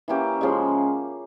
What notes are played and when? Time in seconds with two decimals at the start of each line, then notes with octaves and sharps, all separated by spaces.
0.08 E3 A#3 C#4 G4
0.41 C#3 F3 G#3